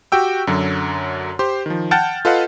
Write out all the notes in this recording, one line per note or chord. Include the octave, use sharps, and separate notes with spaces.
F#4 G4 G5 E6
F#2 D3 F#3
G4 C5 C6
D#3 F3
F#5 G5 A5 F6 G6 A6
F4 A4 B4 D#5 F5 F#5